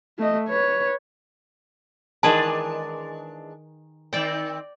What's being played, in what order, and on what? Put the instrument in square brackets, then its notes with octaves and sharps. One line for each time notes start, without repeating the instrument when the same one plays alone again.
[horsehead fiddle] A3 D#5
B4 C#5
[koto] D#3 G#4 B4 [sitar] E3 G#3 D4 [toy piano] A5
[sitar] D#3 C4 [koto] D5 G5